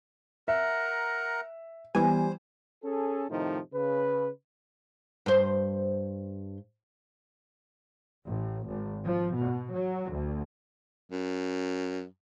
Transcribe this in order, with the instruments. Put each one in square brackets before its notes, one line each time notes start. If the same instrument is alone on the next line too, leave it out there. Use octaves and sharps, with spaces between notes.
[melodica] A#4 F#5 A#5 [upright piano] E5
[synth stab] E3 B3 G#5 [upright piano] G3 [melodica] C5
[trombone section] C#4 G#4 A4
A2 C3 D#3 F3 D#4
C#3 B4
[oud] G2 C5
[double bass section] A1
G#1
F3
B2
F#3
D2
[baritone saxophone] F#2